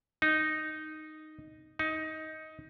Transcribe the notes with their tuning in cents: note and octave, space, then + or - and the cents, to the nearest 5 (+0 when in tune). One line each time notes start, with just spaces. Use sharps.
D#4 -5
D#4 +15